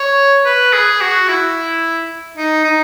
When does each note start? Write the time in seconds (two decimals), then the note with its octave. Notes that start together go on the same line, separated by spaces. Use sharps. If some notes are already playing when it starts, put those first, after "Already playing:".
Already playing: C#5
0.45 B4
0.73 G#4
1.01 F#4
1.28 E4
2.37 D#4
2.64 D#4